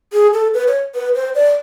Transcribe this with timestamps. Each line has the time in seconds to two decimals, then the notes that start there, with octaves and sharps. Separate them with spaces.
0.13 G#4
0.34 A4
0.54 B4
0.68 C#5
0.95 B4
1.15 C5
1.35 D5